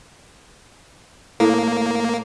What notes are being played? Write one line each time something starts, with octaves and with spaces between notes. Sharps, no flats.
A2 A#3